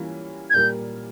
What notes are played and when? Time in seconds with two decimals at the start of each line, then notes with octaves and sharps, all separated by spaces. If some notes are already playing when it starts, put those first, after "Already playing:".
Already playing: E3 G3 A#3 C#4 F4
0.50 G#6
0.54 A#2 G3 A#3 G6